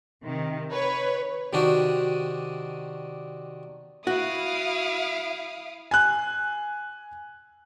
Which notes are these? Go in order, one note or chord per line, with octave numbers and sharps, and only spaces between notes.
C3 D#3
B4 C#5
C3 D#3 D4 D#4 F#4
E4 F#4 F5 D#6 D7
G#5 F#6